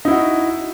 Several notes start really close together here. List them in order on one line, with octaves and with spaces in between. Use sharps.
D#4 E4 F#4